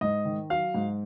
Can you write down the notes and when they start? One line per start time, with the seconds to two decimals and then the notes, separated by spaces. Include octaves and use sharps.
0.01 G#2 D#5
0.25 D#3
0.50 F#3 F5
0.74 G#2